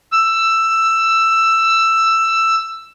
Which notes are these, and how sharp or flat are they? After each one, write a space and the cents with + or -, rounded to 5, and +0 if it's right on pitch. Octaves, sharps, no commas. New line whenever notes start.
E6 +10